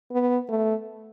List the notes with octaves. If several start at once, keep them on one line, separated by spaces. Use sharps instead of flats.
B3
A3